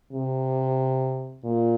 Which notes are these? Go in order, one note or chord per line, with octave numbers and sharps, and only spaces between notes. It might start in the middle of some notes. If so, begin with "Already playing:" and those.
C3
A#2